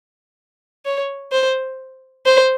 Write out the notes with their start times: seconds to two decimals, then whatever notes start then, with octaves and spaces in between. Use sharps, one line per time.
0.85 C#5
1.32 C5
2.26 C5